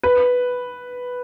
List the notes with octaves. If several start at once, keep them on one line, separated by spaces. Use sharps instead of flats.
B4